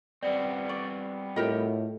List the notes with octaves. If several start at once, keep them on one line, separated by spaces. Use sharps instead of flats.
G3 B3 C4 D5
D5 C#6
A2 F4 G4 A#4 D#5